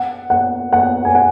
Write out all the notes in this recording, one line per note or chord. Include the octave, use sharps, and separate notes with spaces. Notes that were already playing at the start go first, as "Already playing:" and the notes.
Already playing: F#5
F#5
F#5
G#5
F#5